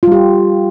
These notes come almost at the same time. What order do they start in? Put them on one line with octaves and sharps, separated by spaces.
F4 G3 G4